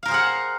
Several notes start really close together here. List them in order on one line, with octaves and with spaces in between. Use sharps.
F5 A#4 C5 G#4 F#5